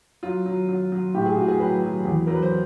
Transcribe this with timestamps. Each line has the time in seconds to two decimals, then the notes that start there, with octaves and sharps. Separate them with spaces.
0.23 F#3 F4
0.46 F#3
0.68 F#3
0.92 F#3
1.14 A2 G4
1.26 G#4
1.37 A2 F#4
1.48 G#4
1.60 F#3 B4
1.82 F#3
2.05 E2
2.27 F#3 A#4
2.34 B4
2.42 C5